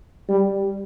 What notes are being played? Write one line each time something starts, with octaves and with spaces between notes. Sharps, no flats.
G3